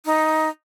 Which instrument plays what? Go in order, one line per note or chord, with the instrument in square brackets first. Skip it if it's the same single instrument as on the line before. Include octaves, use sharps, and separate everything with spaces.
[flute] D#4